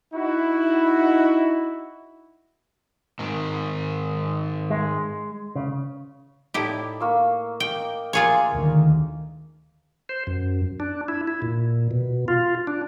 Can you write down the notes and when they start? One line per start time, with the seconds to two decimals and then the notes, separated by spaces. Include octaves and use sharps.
0.14 D#4 E4 F#4
3.19 G#2 D#3
4.70 G#3
5.55 C#3
6.54 A2 D#4 E4 G4 D5 A5
7.00 A#3 C#6 E6
7.60 D#5 G5 D6
8.13 G#3 A#3 F4 G#4 C#5 E5
8.52 D2 D#3
10.09 C5
10.27 F#2
10.80 D4
11.08 E4
11.27 E4
11.42 A#2
11.91 B2
12.28 F4
12.67 D4